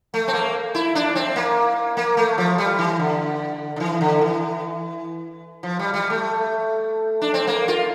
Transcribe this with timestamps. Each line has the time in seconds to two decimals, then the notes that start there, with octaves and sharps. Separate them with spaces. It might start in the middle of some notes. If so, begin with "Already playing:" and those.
0.14 A3
0.28 C4
0.33 A#3
0.75 E4
0.95 D4
1.15 C4
1.36 A#3
1.97 A#3
2.17 A3
2.38 F3
2.58 G3
2.79 E3
2.99 D3
3.76 D3
3.80 E3
4.01 D3
4.21 E3
5.63 F3
5.79 G3
5.94 G3
6.10 A3
7.22 D4
7.34 C4
7.47 A#3
7.68 F4